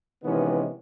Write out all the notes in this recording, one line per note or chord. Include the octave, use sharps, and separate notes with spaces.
C3 D#3 E3 G#3 B3 C#4